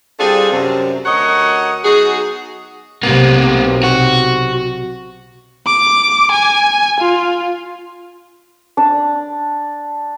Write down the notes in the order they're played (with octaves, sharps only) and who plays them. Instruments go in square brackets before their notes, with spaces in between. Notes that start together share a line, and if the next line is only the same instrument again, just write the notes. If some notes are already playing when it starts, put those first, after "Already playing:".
[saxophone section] G3 C4 D4 F4 G#4 A4
F#2 C3
D2 A#4 C#5 D#5 F#5
F#3 B3 D#4 F#4 G#4
[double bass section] B1 C3 [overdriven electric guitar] A#3 B3
[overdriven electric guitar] F#4
[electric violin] D6
G#5
F4
[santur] D4